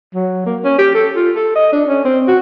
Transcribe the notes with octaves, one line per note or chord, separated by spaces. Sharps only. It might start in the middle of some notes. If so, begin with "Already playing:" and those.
F#3
A#3
C#4
G4
A4
F4
A4
D#5
D4
C#4
C4
F#4